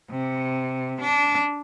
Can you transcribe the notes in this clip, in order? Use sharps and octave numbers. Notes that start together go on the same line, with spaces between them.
C3
D4